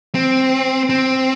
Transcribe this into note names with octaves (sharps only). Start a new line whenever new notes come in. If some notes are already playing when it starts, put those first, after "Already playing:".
C4
C4